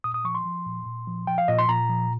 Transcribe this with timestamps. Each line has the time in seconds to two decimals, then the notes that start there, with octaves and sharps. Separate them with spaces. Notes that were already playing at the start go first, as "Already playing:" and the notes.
0.04 A#2 D#6
0.14 D#6
0.24 F3 C#6
0.35 C6
0.45 F3
0.66 A#2
0.86 A#2
1.07 F3
1.27 F3 G5
1.38 F5
1.48 A#2 D#5
1.59 C6
1.68 A#2 A#5
1.89 F3